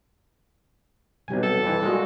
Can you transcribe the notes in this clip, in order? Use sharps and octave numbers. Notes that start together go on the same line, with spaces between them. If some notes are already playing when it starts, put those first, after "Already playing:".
B1 C3 G3 G4 G#5
A4
F2 E3
A#2 G#3 F#4 G#4